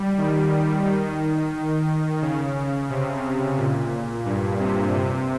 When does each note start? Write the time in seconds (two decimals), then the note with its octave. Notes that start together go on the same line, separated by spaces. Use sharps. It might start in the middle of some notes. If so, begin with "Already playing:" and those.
Already playing: G3
0.18 D#3
0.85 D#3
2.22 C#3
2.90 C3
3.58 A#2
4.26 G2
4.60 C3
4.94 C3